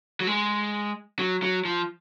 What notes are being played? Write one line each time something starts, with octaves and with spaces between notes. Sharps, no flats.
F#3
G#3
F#3
F#3
F3